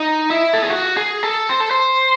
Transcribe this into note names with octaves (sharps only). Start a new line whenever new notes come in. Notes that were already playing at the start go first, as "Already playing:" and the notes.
Already playing: D#4
E4
A4
G#4
F#4
G#4
A4
C5
A4
C5